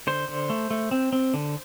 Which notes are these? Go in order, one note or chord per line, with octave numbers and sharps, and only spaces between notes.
D3 C5
D3
A3
A3
C4
C4
D3